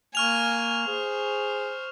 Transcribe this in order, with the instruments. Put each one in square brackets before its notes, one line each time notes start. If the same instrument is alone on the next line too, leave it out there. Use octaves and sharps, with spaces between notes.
[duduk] A#3 [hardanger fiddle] G#5 [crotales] C#6 F6 F7
[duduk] G#4 [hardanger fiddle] C5